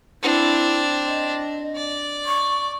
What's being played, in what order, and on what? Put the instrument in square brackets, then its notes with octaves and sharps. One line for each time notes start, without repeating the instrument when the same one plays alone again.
[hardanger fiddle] C4 D4 [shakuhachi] E4
[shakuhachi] D#5
[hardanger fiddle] D5
[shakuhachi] C#6